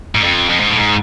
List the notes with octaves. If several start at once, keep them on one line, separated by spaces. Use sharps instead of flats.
G#2
F2
F2
G#2
A2
G#2